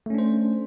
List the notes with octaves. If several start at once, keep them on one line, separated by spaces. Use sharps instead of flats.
A3 C#4 D4 C5